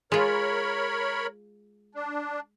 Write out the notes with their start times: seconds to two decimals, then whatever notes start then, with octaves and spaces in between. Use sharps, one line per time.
0.12 G#3 F4 A#4 C#5 B5
1.95 D4